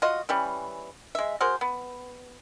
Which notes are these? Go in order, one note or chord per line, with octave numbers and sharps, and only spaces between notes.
F4 F#4 D#5
E3 G3 C#4
G#3 E5
F#4 G#4 A#4 C5
B3